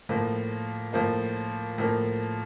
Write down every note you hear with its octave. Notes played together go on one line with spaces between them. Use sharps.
A2 F3 A#3
A2 F3 A#3
A2 F3 A#3